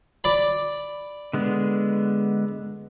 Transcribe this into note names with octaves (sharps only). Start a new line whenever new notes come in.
D5 B5
D3 G#3 B3